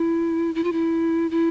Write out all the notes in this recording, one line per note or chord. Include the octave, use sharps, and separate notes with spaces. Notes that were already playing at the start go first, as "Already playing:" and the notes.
Already playing: E4
E4
F4
E4
E4